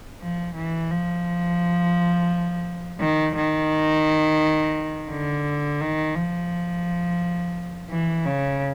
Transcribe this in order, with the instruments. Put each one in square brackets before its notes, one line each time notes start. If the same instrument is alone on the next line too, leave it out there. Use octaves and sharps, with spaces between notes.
[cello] F3
E3
F3
D#3
D#3
D3
D#3
F3
E3
C#3